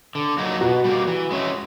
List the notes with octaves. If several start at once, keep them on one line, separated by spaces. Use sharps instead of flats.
D3
F#3 A#3 D#4 F#4
B2 F#4
G3 A#3
E3
G#3 C#4 E4